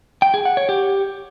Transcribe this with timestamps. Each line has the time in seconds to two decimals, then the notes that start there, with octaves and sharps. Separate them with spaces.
0.22 G5
0.34 G#4
0.45 F#5
0.57 C#5
0.69 G4